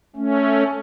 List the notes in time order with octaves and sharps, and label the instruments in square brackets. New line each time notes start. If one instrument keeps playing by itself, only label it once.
[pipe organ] A3 C#4